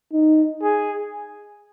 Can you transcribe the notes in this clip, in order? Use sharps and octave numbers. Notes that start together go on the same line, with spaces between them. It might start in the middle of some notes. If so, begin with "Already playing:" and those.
D#4
G#4